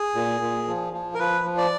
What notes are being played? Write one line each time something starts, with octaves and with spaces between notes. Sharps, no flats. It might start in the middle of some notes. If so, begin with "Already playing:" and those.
Already playing: G#4
A#2
A#2
F3
F3
A#4
F3 B4
F3
D5